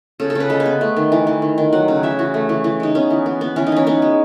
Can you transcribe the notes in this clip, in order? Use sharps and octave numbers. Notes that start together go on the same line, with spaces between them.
C#3 A4
A4
C#3 B4
G#3 A4
B4
B3
A3
D#3
E3
E3
D#3
D#3
F#3 F#5
C#3
E3 E5
E3 F#4
A3
E3
E3
G#3 D#4
B3 C#4
E3
B3
B3
E3 C#4
D#4
E3 C#4
B3 D#4
G#3